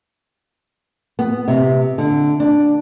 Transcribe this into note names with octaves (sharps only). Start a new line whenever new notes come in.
B3
C3
D3
D4